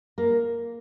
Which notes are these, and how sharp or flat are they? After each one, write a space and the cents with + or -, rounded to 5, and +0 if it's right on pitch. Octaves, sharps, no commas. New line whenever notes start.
A#3 +0 A#4 +0